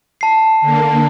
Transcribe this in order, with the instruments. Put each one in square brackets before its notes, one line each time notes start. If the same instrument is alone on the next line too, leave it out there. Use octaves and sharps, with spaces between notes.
[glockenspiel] A5 C7
[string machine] D3 A#3